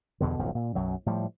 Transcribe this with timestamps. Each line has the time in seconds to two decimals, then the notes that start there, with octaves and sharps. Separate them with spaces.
0.20 E2 G2 B2 D3
0.39 D1 B1 F#2 F3
0.55 A#2
0.75 B1 F#2 F#3
1.06 A2 F3 G3